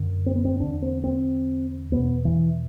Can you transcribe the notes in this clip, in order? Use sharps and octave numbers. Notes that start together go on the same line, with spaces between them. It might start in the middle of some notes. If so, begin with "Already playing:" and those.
Already playing: F#2 D3
C4
B3
C4
E2 D3 D4
C4
C4
E2 B2 B3
E3